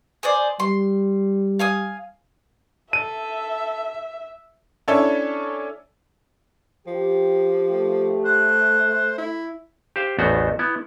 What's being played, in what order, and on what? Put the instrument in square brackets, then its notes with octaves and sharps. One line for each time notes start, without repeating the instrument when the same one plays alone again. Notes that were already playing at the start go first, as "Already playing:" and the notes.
[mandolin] G#4 C5 D5
[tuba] G3 [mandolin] C6
[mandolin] F5 G#5 D#6
[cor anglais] A4 [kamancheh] E5 [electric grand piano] D#7
[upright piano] C#4 D4 E4 A4 C#5 E5
[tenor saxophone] F3 [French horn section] G4
[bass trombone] A3
[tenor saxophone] C5 [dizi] F#6
[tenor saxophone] E4
[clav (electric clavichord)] G4 C5 F5
A1 E2 A3 B3 F#4 C5
B3 E4